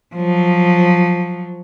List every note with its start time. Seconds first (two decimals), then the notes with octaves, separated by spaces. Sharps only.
0.15 F3 F#3